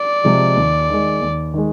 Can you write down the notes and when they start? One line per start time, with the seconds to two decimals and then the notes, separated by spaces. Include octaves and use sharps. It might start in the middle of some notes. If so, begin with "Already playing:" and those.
Already playing: D5
0.24 C3 F3 G#3
0.56 D#2
0.90 D#3 G#3
1.21 D#2
1.54 D#3 G#3